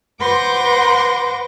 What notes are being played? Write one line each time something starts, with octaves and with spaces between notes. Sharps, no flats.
B4 C5 F#5 C6 D6 A#6